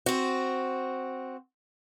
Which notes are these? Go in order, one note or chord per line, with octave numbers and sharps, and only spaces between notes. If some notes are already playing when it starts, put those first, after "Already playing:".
C4 F#4